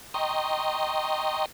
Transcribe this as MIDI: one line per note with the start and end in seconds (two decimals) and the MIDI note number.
0.14 1.46 75
0.14 1.46 79
0.14 1.46 82
0.14 1.46 84
0.14 1.46 85
0.14 1.46 87